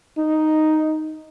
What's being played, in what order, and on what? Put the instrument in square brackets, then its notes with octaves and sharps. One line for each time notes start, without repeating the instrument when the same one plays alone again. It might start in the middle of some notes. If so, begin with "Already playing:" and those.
[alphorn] D#4